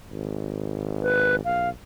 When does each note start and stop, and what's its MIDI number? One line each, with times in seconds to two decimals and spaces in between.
0.11 1.43 32
1.02 1.36 71
1.45 1.71 35
1.45 1.69 77